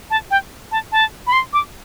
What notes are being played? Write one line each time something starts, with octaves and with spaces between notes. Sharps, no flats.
A5
G5
A5
A5
B5
C6
D6